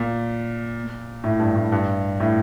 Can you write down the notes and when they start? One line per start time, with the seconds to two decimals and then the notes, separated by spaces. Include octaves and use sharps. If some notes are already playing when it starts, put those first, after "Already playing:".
Already playing: A#2
1.24 A2
1.40 G2
1.56 A2
1.72 G2
2.20 A2